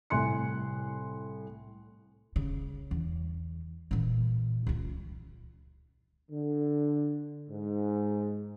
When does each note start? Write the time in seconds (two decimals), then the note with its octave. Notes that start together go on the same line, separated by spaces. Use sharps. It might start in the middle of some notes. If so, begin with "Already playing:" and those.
0.10 C2 A2 G#5 C6 F#6 C#7
2.36 C#3
2.91 E2
3.91 A#2 E3
4.67 C#2 F4
6.30 D3
7.50 G#2